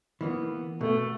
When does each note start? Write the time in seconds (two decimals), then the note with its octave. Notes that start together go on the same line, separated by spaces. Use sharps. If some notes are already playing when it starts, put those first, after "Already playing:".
0.21 E3 A#3 B3
0.81 B2 A3